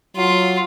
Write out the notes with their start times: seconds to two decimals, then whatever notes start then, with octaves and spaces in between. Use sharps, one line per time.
0.16 F#3 F4